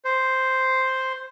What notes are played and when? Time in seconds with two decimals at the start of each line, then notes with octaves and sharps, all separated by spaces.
0.05 C5